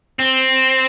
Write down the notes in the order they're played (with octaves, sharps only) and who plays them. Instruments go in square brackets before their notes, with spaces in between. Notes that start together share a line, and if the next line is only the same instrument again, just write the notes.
[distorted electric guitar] C4